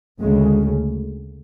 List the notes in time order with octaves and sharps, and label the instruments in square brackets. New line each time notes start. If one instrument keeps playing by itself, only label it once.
[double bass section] D2 C#3 G#3